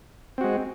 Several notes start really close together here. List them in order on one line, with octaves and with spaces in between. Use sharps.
C4 F#4 G#3